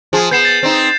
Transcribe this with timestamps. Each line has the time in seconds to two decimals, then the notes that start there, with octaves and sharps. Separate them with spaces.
0.13 F3 G#4
0.31 B3 G6 C7 E7
0.45 A6
0.63 C4 D#4